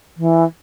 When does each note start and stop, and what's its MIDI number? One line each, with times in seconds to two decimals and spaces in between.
0.17 0.44 52